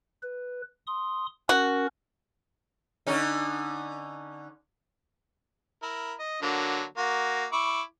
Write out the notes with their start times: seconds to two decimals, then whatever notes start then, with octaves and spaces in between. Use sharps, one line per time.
0.23 B4
0.87 C6 D#6
1.49 C#4 F#4 A#4
3.07 D3 C#4 D#4
5.82 E4 A#4
6.19 D#5
6.42 D3 F#3 A#3
6.97 A#3 F#4
7.52 E4 C#6 D6